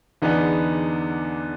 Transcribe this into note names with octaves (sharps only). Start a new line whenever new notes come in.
E2 D3 B3 D#4 G#4 D5